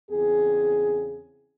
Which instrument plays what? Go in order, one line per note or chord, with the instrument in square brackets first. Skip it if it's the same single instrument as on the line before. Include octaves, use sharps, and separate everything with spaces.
[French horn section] E2 C#3 C4 G#4